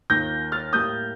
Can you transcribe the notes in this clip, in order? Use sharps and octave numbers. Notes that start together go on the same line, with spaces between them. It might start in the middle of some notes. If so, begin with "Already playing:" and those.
D#2 D#3 A#3 F4 G6 A#6
F6 A6
A2 G3 A#3 D#6 G6